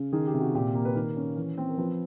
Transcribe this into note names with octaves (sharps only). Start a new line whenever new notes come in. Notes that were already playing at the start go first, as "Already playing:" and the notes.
Already playing: C#3
D#3 G#4
G4
C3
F#4
A#2 G4
A#3
B4
D#3 A#4
C#4
E3
C4
A#4
F3 B4